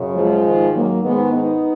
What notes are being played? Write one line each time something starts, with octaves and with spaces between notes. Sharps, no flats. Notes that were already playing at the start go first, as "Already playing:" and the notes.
Already playing: F#2 C#3
F3 G#3
G#2 D#3
F#3 A#3
G#2 D#3 G#3 B3
B3 D#4